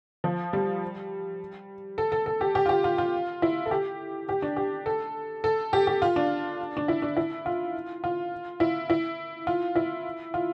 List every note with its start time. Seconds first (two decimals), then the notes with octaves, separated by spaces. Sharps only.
0.24 F3
0.53 G3
1.98 A4
2.12 A4
2.26 A4
2.41 G4
2.55 G4
2.66 F4
2.69 G4
2.84 F4
2.98 F4
3.42 E4
3.66 A4
3.71 G4
4.29 G4
4.42 D4
4.56 G4
4.86 A4
5.44 A4
5.73 G4
5.87 G4
6.02 F4
6.16 D4
6.77 D4
6.88 E4
7.02 D4
7.17 E4
7.46 F4
8.04 F4
8.60 E4
8.90 E4
9.47 F4
9.75 E4
10.34 F4